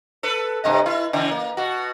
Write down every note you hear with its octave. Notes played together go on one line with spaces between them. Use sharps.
A4 B4
G2 C3 D#5
E4
C#3 E3
A#3
B2 F#4